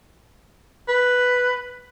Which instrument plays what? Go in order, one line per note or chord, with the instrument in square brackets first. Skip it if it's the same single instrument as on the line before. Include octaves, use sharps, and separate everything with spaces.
[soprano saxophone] B4